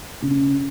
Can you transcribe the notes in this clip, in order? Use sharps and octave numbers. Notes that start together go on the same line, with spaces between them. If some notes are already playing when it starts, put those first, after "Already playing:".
C#3